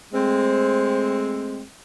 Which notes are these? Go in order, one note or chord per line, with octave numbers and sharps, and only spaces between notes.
G#3 A3 C4